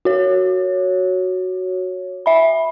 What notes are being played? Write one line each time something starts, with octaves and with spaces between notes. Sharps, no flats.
F#4 C#5
E5 B5